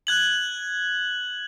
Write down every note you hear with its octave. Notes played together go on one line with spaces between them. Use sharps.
F#6 G#6 F#7